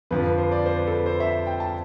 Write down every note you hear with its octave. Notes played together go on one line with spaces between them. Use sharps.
F2 D3 F3 B4
B4
C5
D5
C5
B4
A4
B4
C5
E5
G5
A5